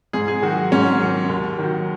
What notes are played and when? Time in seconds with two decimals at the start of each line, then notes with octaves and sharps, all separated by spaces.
0.13 G#2 G#4
0.28 G#4
0.42 D#3 F#3 F#4
0.72 G#2 C#4
1.01 D#3 F#3
1.29 D#2
1.59 D#3 F#3